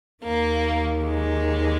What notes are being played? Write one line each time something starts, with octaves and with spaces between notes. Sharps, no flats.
D#2 D#3 A#3
G#3